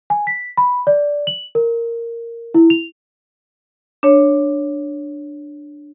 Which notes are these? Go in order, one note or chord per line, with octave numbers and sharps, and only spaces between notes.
G#5
B6
B5
D5
F#7
A#4
E4
F7
D4 C#5